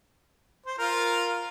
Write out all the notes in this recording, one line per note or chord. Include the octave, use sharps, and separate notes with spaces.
C5
F4 A#4